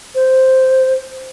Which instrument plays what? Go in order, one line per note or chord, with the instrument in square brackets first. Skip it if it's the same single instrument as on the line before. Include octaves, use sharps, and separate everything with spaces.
[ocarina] C5